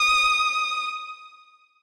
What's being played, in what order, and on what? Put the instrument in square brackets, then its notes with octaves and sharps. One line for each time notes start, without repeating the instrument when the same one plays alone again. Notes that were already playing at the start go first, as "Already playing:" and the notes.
Already playing: [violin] D#6